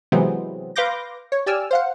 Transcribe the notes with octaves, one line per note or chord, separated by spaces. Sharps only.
C3 E3 F#3 G#3 B3 C4
B4 F5 C6 D6 G6 A#6
C#5
G4 D5 G#5 E6 F6
C5 F5 F#5